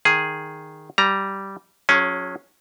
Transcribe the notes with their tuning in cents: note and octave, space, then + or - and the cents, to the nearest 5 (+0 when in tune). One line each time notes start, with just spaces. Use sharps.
D#3 +0 G#4 +0
G3 -10 A#5 +0
F#3 -35 C#4 +0 G#4 +5